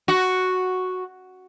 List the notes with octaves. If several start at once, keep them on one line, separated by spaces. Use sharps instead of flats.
F#4